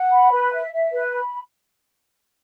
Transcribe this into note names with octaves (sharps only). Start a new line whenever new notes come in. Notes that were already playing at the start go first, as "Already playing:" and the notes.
Already playing: F#5
B5
B4
E5
E5
B4
B5